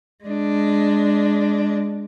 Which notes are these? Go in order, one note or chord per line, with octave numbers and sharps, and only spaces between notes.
G#3 D4